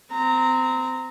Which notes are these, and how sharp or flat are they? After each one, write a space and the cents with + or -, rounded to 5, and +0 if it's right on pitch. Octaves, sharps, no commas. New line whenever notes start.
C4 -25 A#5 -10